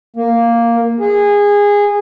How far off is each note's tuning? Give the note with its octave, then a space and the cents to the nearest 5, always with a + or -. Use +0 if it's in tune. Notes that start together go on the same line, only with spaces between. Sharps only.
A#3 +0
G#4 -20